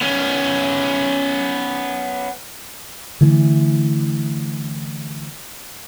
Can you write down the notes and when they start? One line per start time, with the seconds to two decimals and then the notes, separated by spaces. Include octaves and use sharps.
0.01 B3 C#4
3.21 D3 E3 A3